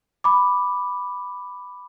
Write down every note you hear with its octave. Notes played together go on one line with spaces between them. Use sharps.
B5 D6